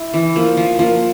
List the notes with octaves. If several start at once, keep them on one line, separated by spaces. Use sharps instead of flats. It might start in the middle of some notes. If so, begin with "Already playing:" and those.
Already playing: E4
E3
F3 A#3
F3
F3 A#3